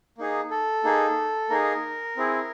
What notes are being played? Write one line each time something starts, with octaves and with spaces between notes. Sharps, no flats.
A#3 D#4 G#4
A4
A#3 D#4 G#4
A#3 D#4 G#4 A#4
C4 E4 G#4